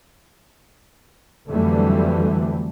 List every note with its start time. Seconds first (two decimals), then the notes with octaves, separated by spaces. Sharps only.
1.47 F2 D3 E3 F#3 G3 A3